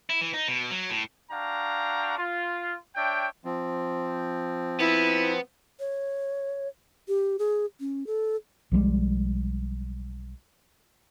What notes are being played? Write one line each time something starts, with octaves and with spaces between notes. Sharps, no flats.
E4
E3
D#4
B2
F#3
A2
D4 F#4 F5 G5 A#5
F4
D4 C#5 E5 G5
F3 C4
B3 E4
C#5
G4
G#4
C#4
A4
B1 F3 G3 G#3